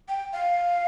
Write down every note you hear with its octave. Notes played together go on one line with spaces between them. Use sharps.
G5
F5